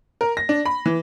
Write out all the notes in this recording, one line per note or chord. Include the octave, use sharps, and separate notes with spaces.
A#4
A#6
D4
B5
E3